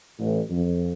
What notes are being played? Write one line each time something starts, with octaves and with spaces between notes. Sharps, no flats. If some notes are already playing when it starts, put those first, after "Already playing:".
A1
F2